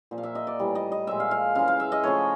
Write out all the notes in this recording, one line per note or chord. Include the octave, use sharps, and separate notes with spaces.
A#2 F3 A#3
F5
E5
D#5
D5
A2 E3 G3
D#5
D#5
A#2 F3 G#3 E5
F5
F5
C#3 E3 G#3 F5
F5
E5
D#5
C#3 F3 A3 C#5